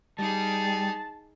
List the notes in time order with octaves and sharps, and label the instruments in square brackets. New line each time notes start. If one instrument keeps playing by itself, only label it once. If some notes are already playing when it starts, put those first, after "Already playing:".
[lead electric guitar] G3 [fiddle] D#4 G#4 [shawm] A5